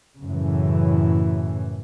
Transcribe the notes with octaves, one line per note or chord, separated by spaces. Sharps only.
F#2 A2 C#3 E3